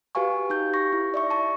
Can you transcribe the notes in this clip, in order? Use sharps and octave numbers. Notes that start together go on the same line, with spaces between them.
F#4 G4 B4 F5 G#5 C#6
D#4 G4 G6
C#6 A#6
E4
D5 E5 C#6
A5 C#6